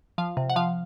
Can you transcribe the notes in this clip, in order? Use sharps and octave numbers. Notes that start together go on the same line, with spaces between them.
F3 F5
C3
F#5
F3 F5